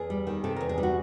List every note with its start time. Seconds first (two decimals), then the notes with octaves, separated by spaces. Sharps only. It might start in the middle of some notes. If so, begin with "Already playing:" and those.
Already playing: E2 G#4
0.10 G3
0.27 D#3
0.44 C3 A4
0.56 E2 A#4
0.69 G#4
0.78 G3
0.83 F#4